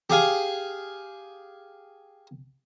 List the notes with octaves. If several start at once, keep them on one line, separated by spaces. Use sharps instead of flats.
G4 G#4 F5 G#5